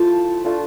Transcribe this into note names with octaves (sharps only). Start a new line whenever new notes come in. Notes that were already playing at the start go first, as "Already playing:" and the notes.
Already playing: F3 A3 E4 A5
A3 D4 F4